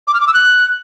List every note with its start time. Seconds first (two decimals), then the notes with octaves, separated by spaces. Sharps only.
0.07 D6
0.14 F6
0.21 D6
0.27 E6
0.34 F#6